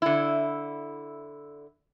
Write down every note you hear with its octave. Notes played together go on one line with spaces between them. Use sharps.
D3 E4